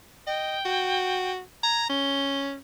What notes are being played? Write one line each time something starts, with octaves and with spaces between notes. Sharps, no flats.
D#5 G5
F#4
A#5 G#6
C#4 G7